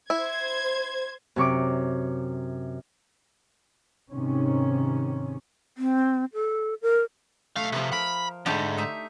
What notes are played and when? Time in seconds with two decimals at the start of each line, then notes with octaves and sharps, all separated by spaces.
0.10 E4 C5 G#6
1.36 F#2 C3 C#6 D6
4.09 G#2 C3 D#3 C#4
5.78 C4
6.34 A4
6.82 A#4
7.56 B1 A3 F5
7.72 C3 F3 B4
7.93 A#4 B5
8.46 F2 G#2 D3 A3 G4
8.78 D#4 E5